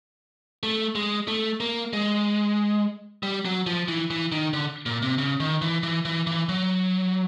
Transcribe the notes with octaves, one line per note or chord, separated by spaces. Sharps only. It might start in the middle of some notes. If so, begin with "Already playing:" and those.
A3
G#3
A3
A#3
G#3
G3
F#3
F3
E3
E3
D#3
D3
A#2
C3
C#3
D#3
E3
E3
E3
E3
F#3